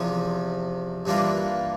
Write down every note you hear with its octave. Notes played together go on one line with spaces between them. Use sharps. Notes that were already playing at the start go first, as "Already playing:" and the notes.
Already playing: E2 C3 F3
G2 E3 A#3 D4 F4